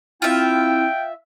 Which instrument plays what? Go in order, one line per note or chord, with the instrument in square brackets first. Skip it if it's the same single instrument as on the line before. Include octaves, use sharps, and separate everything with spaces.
[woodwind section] C4 E4 [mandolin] F4 E5 [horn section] G5